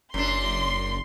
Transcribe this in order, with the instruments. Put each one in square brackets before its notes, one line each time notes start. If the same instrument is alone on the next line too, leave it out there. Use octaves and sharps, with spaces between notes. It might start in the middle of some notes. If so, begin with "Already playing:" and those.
[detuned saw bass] F#1 [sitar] F#2 D4 [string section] C6